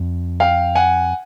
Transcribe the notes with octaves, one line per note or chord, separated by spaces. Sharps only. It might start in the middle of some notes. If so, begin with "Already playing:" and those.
Already playing: F2
F5 G5
F#5 G#5